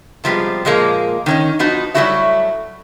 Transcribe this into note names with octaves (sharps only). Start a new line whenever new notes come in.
C3 F3 G3 G#3 B3
A#2 F3 G#3 A#3
D#3 C#4 D#4
F3 B3 D#4 F#4
F#3 G3 A3 E4 F#4 E5